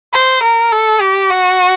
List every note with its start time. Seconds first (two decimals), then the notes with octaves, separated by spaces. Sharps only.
0.14 C5
0.43 A#4
0.72 A4
1.01 G4
1.30 F#4